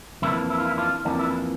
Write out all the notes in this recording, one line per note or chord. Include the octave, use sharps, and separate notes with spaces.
F2 E3 A#3 D4 E4
E4
F4
E4
D4 F4
F2 E3 A#3 D4
E4
D4